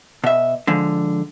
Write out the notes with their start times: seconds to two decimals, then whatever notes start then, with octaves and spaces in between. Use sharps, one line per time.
0.24 B2 E5
0.67 D3 F3 G#3